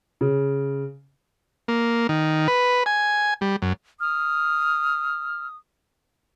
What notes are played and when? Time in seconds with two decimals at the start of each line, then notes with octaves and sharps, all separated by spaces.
0.21 C#3
1.68 A#3
2.09 D#3
2.48 B4
2.86 G#5
3.41 G3
3.62 F#2
4.00 D#6 F6